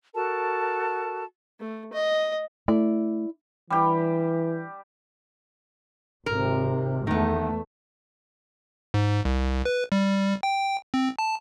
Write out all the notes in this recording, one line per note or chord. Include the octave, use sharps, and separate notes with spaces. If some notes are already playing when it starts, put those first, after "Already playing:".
F#4 A4 A#4 A5
A3
D#5
A3 E4 D5
E3 G3 G4
G#1 C3 A#4
E2 D#3 A3 B3
G#2
C2
B4
G3
G5
C4
A5